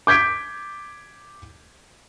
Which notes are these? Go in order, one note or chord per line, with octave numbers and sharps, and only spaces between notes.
D6 G6 G#6 B6 D7